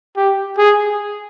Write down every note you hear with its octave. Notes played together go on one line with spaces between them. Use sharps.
G4
G#4